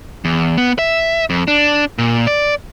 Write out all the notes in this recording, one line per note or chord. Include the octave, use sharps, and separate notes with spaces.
E2
B3
E5
F2
D4
A#2
D5